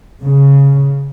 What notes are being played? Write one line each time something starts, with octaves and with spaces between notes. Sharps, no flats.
C#3